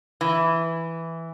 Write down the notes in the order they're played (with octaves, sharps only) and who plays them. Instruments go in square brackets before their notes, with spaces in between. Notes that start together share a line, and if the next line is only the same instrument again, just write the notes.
[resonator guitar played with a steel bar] E3